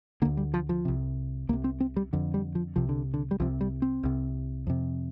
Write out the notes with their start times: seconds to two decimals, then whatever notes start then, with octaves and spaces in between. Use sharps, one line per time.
0.22 D3 A#3
0.25 D2
0.37 G3
0.54 F3
0.69 F3
0.85 C2 C3
1.49 C2 A#3
1.53 C3
1.64 C4
1.80 C4
1.96 G3
2.13 F2 D3
2.34 G3
2.55 F3
2.76 C2 C3 F3
2.89 D3
3.14 D3
3.31 G3
3.40 C2 C3 F3
3.61 G3
3.82 C4
4.03 C2 C3
4.67 F2 C3